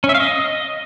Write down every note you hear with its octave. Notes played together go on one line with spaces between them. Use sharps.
C#4
E5
F5
D#5